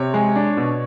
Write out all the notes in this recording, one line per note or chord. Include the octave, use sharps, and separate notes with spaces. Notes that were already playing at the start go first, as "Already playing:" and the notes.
Already playing: C3 C#5
G#3
D4
B2